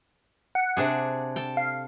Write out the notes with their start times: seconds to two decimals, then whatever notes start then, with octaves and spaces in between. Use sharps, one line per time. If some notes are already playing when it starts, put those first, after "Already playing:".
0.55 F#5
0.77 C3 D4 G#4
1.36 A4 G5
1.57 F5